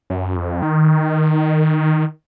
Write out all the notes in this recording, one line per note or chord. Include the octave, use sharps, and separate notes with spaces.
F#2
F2
D#3